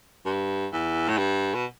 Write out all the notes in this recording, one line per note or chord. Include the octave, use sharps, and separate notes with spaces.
G2
E2
A2
G2
B2